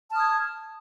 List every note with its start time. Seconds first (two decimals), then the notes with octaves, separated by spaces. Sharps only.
0.11 A5
0.14 F6
0.16 D#6
0.19 G#6